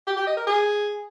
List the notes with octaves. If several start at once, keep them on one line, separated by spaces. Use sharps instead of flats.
G4
G4
D#5
A#4
G#4